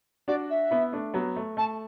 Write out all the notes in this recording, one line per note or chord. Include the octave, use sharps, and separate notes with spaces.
D4 F#4 D5
E5
B3 E4
A3 D4
F#3 B3
A3
A3 A5